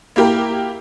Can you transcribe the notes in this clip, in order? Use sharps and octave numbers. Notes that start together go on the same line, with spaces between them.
A#3 E4 G4 A#4